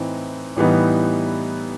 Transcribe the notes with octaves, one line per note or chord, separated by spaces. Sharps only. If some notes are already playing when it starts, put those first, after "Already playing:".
Already playing: A2 E3 C4 D#4
A2 E3 G3 B3 D#4